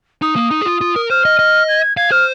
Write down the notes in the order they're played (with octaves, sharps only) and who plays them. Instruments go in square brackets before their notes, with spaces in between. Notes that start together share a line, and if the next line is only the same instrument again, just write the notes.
[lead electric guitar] D#4 [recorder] D#6
[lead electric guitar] A#3
D#4
G#4
F4
F4
A#4
[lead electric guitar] C5 [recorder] F6
[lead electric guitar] D#5
D#5
[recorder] G#6
[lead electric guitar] F5 [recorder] G#6
[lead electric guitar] C5 [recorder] F6